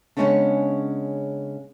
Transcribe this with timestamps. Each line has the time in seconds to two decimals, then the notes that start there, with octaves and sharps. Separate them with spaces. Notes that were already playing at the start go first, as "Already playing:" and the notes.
0.17 C#3 E3 G#3 B3 C#4 D4